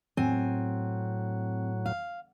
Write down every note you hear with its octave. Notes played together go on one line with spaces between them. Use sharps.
A2 F#3 C4 G#5
F5